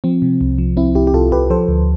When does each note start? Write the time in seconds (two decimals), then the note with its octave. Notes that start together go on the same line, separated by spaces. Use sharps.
0.04 F3 C4
0.22 C3
0.41 C2
0.58 F3
0.77 C2 C4 E4
0.95 C2 E4 G4
1.07 G4
1.14 C2 F4 A4
1.32 C2 G4 B4
1.50 F3 A4 C5
1.68 D2